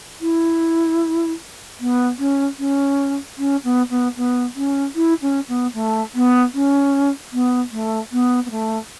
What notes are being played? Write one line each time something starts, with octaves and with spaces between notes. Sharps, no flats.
E4
B3
C#4
C#4
C#4
B3
B3
B3
C#4
E4
C#4
B3
A3
B3
C#4
B3
A3
B3
B3
A3